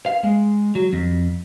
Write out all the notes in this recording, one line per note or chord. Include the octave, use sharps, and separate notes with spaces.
F5
G#3
F#3
F2